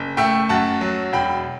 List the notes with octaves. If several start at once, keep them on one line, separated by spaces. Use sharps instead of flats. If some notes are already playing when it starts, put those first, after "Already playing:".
Already playing: F#1
A3 E5 G5
F#2 F#5 A5
F#3
E1 G5 B5